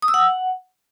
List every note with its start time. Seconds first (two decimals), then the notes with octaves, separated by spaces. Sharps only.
0.02 D#6
0.08 E6
0.14 F#5